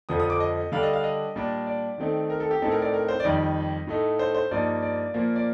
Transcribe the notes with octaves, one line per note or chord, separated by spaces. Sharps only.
F2 D3 F3 D#6
D#6
D6
D#5
D3 G3 D4 F5
D#5
F5
D#5
A#2 G3 D4
D5
D#3 A3 C4 D#4
A#4
A4
G4
A2 A3 C4 D#4 A4
A#4
D5
A#4
C5
D5
F2 D#3 G3 D#5
A2 A3 D#4
C5
C5
G2 F3 A#3 D#4 D5
D5
A#2 F3 A#3
D5